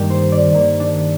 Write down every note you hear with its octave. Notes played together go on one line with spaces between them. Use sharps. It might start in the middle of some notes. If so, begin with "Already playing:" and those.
Already playing: G2 D#3 A#3 G4
C5
D5
G2 D#3 A#3
D4